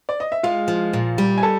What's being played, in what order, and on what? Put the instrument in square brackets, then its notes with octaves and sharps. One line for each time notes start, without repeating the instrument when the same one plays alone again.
[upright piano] D5
D#5
E5
[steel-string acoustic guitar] G#3 [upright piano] F4 F5
[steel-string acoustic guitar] F3
A#2
G3
[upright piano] G#5
A4 A5